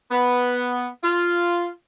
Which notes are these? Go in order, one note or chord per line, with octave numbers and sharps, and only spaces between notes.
B3
F4